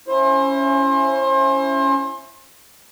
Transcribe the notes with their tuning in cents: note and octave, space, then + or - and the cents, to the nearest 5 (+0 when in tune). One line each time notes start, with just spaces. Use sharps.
C#4 +0 E4 +15 C5 +35